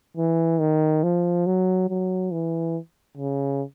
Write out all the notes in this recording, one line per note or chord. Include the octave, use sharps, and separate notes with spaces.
E3
D#3
F3
F#3
F#3
E3
C#3